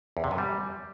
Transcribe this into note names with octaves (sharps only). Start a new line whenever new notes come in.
E2
C3
F#2
G3